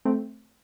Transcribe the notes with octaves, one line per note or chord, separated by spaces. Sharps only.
A3 C4